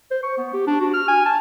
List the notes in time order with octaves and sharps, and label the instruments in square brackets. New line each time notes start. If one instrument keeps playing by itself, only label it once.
[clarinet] C5
C#6
B3
G4
D4
F#4
F6
G#5
A5